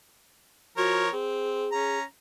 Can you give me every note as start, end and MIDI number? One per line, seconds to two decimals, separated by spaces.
0.77 1.09 53
0.77 1.05 66
0.77 1.09 70
0.77 1.09 73
1.12 1.66 60
1.12 1.98 68
1.72 2.03 61
1.72 2.03 82